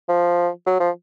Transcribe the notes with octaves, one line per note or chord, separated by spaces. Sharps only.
F3
F#3
F3